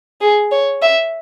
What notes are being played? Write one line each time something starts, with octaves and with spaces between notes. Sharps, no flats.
G#4
C#5
E5